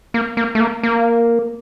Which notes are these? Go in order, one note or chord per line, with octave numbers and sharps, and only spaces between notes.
A#3
A#3
A3
A#3
A#3